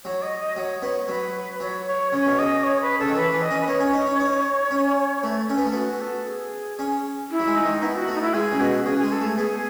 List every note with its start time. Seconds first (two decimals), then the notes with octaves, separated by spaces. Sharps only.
0.05 F#3 C#5
0.22 D#5
0.40 D#5
0.56 F#3 C#5
0.82 B3 C#5
1.08 F#3 B4
1.60 F#3 C#5
1.87 C#5
2.12 C#3 C#5
2.26 B2
2.39 C#3 D#5
2.63 C#5
2.81 B4
2.99 C#3 A4
3.08 D#3
3.16 E3 B4
3.33 E3
3.42 D#5
3.51 C#4
3.60 B4
3.67 B3 C#5
3.80 C#4
3.93 D#4
4.07 C#4
4.20 D#4
4.71 C#4
5.23 A3 B4
5.49 C#4 A4
5.57 B3
5.65 A3
5.73 B3 F#4
6.01 A4
6.27 G#4
6.79 C#4
7.31 E4
7.40 F#3
7.47 G#3
7.56 D#4
7.65 D#3
7.82 B3 E4
7.96 F#4
8.08 A3
8.15 D#4
8.22 E4
8.34 G#3 G#4
8.52 C#3
8.60 B2 F#4
8.86 C#3 G#4
8.98 G#3 G#4
9.12 A4
9.21 A3 G#4
9.38 B3 G#4